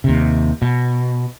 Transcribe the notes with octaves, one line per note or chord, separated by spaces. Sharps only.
D#2 C3
B2